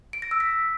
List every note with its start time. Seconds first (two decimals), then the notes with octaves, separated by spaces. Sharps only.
0.13 D7
0.22 A#6
0.31 E6
0.40 B6